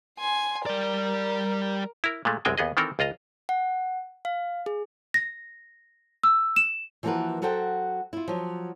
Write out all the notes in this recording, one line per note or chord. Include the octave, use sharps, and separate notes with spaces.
G#5 C6
G3 A#4 D5
E4 A#4
A#2 G#3 A3
C2 F#2 G#3 C4 G5 G#5
D#2 B3 G#4 D#5
D#3 E3 C4 A4 A#4
C#2 F4 D#5 A#5
F#5
F5
G#4
A#6
E6
E7
E3 F3 A#3 F#4 A#4 B4
F#3 F#4 A4 C5 G5
E4 F4
F3 F#3